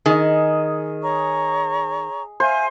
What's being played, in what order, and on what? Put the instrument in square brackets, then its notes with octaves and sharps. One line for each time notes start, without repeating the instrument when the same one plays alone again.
[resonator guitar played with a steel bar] D#3 [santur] G#4 D#5
[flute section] C#5 A#5 C#6
[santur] C5 [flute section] E5 F5 G#5